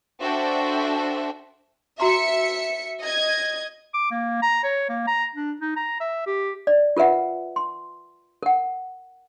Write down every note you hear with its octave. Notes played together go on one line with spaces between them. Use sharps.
D4 F#4 A4 C5 E5 G5
F#4 E5 A#5 C6 C#7
D#5 G#6
D6
A#3
A#5
C#5
A#3
A#5
D4
D#4
A#5
E5
G4
D5
F4 A#4 B4 E5 F#5
C6
A#4 F#5